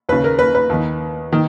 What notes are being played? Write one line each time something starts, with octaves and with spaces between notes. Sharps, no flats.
D#2 C#3 B4
A#4
B4
B4
D#2 D#3
D#3